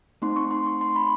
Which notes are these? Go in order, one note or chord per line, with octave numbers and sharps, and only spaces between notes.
A3 C4 D#4 C6
C#6
C6
C#6
C6
B5